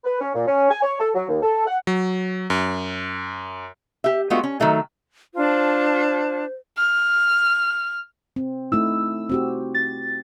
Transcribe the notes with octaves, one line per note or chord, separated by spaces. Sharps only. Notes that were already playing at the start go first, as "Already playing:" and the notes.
B4
C#4
A#2
C#4
G#5
C#5
A4
F#3
D#2
A4
F#5
F#3
F#2
G4 E5
G#3 A3 B3 D4 F4 F#4
C#4
D#3 F#3 A3 D#4
D4 F4 C5 A5
F6
C4
A3 D#4 E4 E6
C4 F#4 G4
A6